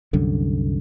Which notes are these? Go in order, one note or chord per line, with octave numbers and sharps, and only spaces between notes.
C2 F#2 D3